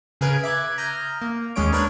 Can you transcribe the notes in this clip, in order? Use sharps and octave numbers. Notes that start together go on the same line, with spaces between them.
C#3 G#4 A#4 B4 G#6 D7
E5 D6 F#6 G#6
A#5 D#6 F6 G6
A#3
D#2 G#3 C#4 C#5 D7
D4 A#4 B4 C#5 F#6 D#7